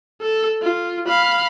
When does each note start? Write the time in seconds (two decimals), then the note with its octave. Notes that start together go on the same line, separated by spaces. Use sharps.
0.22 A4
0.62 F4
1.08 F5 B5